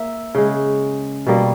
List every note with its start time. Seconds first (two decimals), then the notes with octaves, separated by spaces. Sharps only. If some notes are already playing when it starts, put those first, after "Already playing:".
Already playing: A#3 E5
0.35 C#3 G#3
1.27 B2 G3 A#3